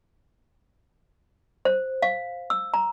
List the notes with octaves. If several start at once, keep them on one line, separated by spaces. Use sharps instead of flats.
C5
F5
E6
A#5